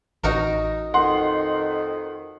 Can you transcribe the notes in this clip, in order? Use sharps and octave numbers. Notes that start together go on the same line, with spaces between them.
A1 D#4 F#4 A#4
F2 D#3 F#5 C6